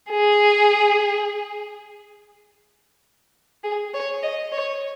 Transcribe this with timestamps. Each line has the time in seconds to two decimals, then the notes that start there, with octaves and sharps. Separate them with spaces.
0.10 G#4
3.63 G#4
3.94 C#5
4.22 D#5
4.52 C#5